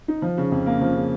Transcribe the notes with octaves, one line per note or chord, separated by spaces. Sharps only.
D#4
F3
C#3
F2
A#3
F3
C#3